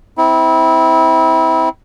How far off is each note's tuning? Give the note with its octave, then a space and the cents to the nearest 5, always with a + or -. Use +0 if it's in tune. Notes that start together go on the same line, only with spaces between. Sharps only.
C4 -20 E4 -25